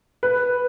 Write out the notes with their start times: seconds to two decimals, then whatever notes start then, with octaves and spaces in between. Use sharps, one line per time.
0.23 B4